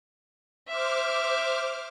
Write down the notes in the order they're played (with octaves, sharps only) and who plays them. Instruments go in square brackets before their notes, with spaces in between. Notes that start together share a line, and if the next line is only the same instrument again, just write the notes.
[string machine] C5 D6 F6 [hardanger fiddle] E5